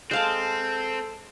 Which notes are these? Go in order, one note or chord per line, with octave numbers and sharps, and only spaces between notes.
G#3 C4 A4 F5 A5